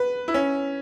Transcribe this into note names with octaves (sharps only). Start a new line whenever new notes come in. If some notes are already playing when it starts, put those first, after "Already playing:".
Already playing: B4
E4
C#4